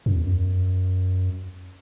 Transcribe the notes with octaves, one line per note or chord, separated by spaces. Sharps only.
F#2
E2
F#2